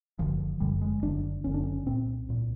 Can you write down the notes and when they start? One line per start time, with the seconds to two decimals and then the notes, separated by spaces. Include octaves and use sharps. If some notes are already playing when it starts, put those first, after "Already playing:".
0.19 F#1 F#2 D3 F3
0.60 F#1 F#2 D3 G3
0.81 G#3
1.03 F#1 F#2 D3 D4
1.44 F#1 F#2 D3 C#4
1.54 D4
1.63 C#4
1.86 C2 A#2 C4
2.29 C2 A#2